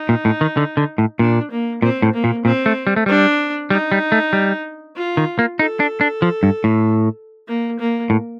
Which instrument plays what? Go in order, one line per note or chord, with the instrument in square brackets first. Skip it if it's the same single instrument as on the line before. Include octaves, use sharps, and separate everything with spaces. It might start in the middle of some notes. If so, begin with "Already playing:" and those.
Already playing: [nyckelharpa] D#4
[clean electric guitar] A#2
A2
D#3
D3
D3
A2
[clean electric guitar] A#2 [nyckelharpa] D4
[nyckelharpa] A#3
[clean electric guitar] A#2 [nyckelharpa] C4
[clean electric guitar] A2
[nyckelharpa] A#3
[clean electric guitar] A#2
[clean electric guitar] A#2 [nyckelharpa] C4
[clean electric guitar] A3
G3
A3
[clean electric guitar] G3 [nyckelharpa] D4
[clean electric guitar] G3 [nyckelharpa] D#4
[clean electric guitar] G3
A3
G3
[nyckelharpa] F4
[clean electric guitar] D#3
A#3
[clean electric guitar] D#4 [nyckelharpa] A4
[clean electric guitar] D4
D4
F3
G2
A2
[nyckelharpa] A#3
A#3
[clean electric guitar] A2